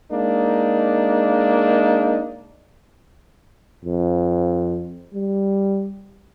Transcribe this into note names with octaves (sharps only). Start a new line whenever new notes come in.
G#3 A#3 D4 D#4
F2
G3